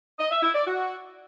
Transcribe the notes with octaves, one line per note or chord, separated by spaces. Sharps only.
D#5
E5
E4
D5
F#4